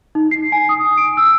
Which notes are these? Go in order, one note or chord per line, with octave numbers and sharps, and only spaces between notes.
D#4
C7
G#5
D#6
D7
E6